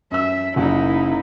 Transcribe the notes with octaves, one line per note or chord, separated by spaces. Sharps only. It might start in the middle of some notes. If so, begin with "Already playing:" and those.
F#2 E5 E6
F#1 F#2 D#4 E4 F#5